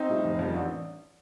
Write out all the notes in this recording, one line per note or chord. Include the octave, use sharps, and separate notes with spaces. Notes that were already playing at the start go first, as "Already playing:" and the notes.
Already playing: C4 D#4
A2 G3
F1
F2 D#3 G3
A1 D4